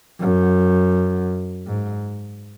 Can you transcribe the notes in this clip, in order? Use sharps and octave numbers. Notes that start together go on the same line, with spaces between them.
F#2
G#2